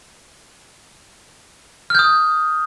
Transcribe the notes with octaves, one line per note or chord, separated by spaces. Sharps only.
D#6 F6 G6